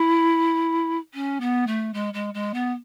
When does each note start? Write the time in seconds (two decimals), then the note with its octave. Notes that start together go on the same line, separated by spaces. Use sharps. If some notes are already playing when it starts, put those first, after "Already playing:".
Already playing: E4
1.14 C#4
1.40 B3
1.67 A3
1.94 G#3
2.13 G#3
2.34 G#3
2.54 B3